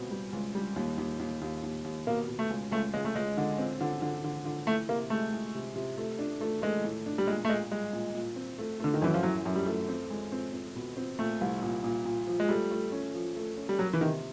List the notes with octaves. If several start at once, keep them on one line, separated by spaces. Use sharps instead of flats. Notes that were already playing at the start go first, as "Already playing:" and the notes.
Already playing: C#2 B2 C4
G3
C#2
G3
D#2
D#2
D#2
D#2
D#2
D#2
B2 A#3
B2
A3
C#2
C#2 A3
C#2 G#3
A3
C#2 G#3
D3
C4
D3
D3
D3
D3
E3 A3
C3 A#3
G#3 A3
G#3
C3
C3
A3
D4
A3
G#3 A3
A2
D4
G3
A#2 G#3
A3
A#2 G#3
G3 G#3
A#2
A#2
C4
A3
D3 A3
D#3
F#2 E3
F3
E3 F#3
F#2
G3
A3
C4
G#3
C4
C4
B2
C4
A#2 A3
C2
A#2
A#2
A#2
F3
G#3
G3 A3
A3
C#4
F3
A3
C#4
G3
F#3 A#3
E3
C3 D#3